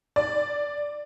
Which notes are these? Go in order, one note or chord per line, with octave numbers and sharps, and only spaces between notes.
D5